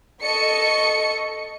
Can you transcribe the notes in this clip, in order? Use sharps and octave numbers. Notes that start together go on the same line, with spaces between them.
A4 D#5 C#6 C#7